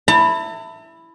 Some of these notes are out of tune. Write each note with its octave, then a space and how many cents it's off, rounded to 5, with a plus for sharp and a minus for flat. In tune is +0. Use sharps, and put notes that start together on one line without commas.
E4 +0 A5 +45